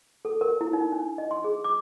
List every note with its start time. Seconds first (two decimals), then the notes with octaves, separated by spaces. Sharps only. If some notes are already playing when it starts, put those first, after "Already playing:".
0.25 A4
0.41 A#4
0.61 E4
0.73 D#4
0.92 D4
1.18 D#5
1.31 C6
1.44 G#4
1.64 D6